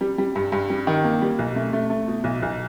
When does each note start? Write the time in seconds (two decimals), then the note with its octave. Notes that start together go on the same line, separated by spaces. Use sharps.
0.01 G3
0.18 G3
0.36 G2
0.52 G2
0.70 G3
0.87 D#3
1.04 A#3
1.21 G3
1.39 B1
1.56 A3
1.73 A3
1.90 A3
2.08 B2
2.24 B1
2.42 B1